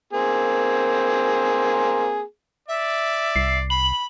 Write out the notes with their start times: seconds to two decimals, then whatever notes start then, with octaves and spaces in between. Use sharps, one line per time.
0.13 A#3 C4 G#4
2.68 D5 E5
3.36 C2 C7
3.70 B5 F#7